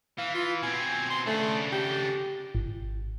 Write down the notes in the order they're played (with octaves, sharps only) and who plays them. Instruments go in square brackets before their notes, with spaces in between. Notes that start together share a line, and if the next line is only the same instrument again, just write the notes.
[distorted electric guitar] E3 [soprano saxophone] F5
[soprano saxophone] F4
[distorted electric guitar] B2 C4 [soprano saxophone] G#5
[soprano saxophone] C6
[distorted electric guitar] C#3 D4 [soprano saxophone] A3
[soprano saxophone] G4
[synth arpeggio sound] G#1